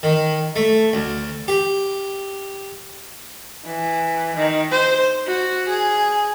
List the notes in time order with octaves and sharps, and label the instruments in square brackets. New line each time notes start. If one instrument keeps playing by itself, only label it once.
[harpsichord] D#3
A3
D2
G4
[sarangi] E3
D#3
C5
F#4
G#4